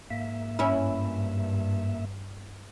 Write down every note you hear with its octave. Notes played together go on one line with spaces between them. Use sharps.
G#2 A#3 E5
G2 C#4 E4